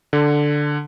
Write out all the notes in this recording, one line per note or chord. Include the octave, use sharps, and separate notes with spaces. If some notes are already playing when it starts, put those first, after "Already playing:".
D3